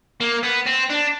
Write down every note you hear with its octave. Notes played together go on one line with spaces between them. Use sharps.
A#3
B3
C4
D4